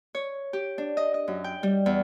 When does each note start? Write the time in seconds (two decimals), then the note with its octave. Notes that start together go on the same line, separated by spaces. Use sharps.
0.15 C#5
0.53 G4
0.78 D4
0.97 D#5
1.14 D#5
1.28 F#2
1.44 G5
1.63 G3
1.86 E2